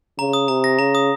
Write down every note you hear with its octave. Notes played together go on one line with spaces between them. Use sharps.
C#3 A#5
D#6
C3 A#5
A#6
C#3 A#5
D#6